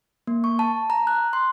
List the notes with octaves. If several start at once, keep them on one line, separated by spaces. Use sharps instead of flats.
A#3
C#6
A5
A#5
F#6
C6